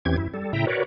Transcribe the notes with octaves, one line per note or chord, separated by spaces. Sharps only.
E2 E3 C4 C#4 G4 G#6
F#2 E4
G3 A4
A2 C#3 E4 E5 G5 A#5
F#4 A#4 B4 C#5 D5